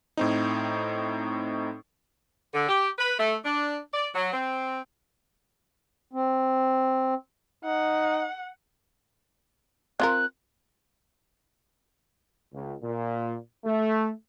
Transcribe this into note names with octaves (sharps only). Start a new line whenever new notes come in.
A2 C4 D#4
D3
G4
B4
A3
D4
D5
F#3
C4
C4
D#4 F#5
C4 F4 A#4 F#6
C#2
A#2
A3